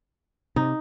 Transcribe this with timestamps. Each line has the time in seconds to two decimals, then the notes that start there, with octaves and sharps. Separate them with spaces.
0.56 C3 D#4